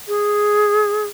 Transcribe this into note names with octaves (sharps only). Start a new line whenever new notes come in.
G#4